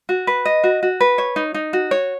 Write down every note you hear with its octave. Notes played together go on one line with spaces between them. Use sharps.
F#4
B4
D#5
F#4
F#4
B4
C#5
D#4
D#4
F#4
C#5